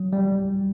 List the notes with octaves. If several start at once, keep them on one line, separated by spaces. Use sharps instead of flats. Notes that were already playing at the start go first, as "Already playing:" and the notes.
Already playing: F#3
G3